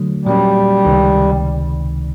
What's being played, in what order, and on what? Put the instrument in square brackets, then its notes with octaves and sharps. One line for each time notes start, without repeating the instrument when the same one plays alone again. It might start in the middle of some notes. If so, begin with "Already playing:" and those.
Already playing: [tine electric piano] D3 F#3 A3
[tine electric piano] A#2 F#3 A#3 C#4 [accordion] G3
[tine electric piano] C#2 C3 D#3